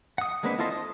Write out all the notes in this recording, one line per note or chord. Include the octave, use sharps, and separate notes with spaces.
F#5 D#6
G#3 A#3 C4 D4 B4
E4 F4 A4 C5 D#5
D#6